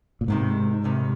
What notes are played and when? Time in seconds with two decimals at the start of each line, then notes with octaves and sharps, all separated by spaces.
0.21 A#2
0.28 C2 G#2 C3 D#3
0.84 C2 C3 D#3